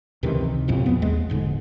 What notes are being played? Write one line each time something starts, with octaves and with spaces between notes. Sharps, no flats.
C#2 C3 D#3 E3
A1 F2 A2 C3
E2 B3
D#2 G#3
E1 G#2 D3